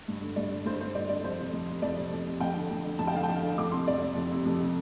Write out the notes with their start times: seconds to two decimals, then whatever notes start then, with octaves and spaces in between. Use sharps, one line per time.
0.08 G2
0.21 D3
0.36 G2 D5
0.52 D3
0.65 G2 C5
0.81 D3 C5
0.95 G2 D5
1.09 D3 D5
1.24 F2 C5
1.38 C3
1.53 F2
1.68 C3
1.82 F2 D5
1.97 C3
2.12 F2
2.27 C3
2.40 F2 G5
2.55 D3
2.71 F2
2.85 D3
2.99 F2 A5
3.07 G5
3.14 D3 F5
3.23 G5
3.29 F2
3.43 D3
3.58 F2 D6
3.72 C3 C6
3.87 F2 D5
4.02 C3
4.16 F2
4.31 C3
4.46 F2
4.61 C3